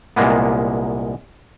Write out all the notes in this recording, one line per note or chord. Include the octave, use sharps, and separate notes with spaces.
C2 A#2 G#3 A#3 B3